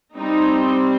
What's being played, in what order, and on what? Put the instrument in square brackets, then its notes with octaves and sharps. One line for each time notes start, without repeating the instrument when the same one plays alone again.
[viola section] G3 C4 D#4